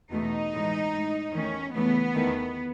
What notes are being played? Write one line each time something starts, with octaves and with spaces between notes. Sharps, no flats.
E2 B2 A3 D#4
A2 E3 G#3
A2 G#3
E2 D#3 A3 C#4
E2 C#3 E3 A3 B3
E2 D#3 A3